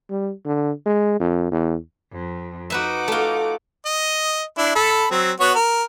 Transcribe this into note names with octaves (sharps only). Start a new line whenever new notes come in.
G3
D3
G#3
F2
E2
F2
D#4 F#4 B4 E5 F#5 D6
A3 F4
D#5
D4 E4
A4 B5
F#3 C4
B3 F#4 C#5
A#4